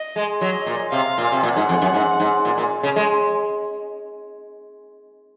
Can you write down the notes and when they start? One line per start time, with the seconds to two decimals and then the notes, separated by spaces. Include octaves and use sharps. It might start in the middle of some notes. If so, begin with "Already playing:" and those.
Already playing: D#5
0.16 G#3
0.41 F#3 D#5
0.66 A#2
0.92 C3 F5
1.18 A#2
1.32 C3
1.43 A#2 F#5
1.56 G#2
1.69 F2
1.82 F#2
1.94 G#2
2.20 G#2
2.45 A#2
2.58 A#2
2.83 C#3
2.96 G#3